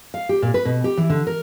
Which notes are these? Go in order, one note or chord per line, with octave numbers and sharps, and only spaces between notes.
F5
G4
A#2
B4
B2
G4
E3
D3
A#4